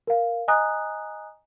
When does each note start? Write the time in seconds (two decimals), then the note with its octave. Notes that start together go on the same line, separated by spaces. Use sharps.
0.07 A#4 F5
0.48 D#5 G#5 A#5 D#6 F#6